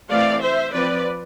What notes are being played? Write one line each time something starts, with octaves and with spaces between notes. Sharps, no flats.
E3 A3 C4 D5 F5
C5 E5
F3 C4 B4 D5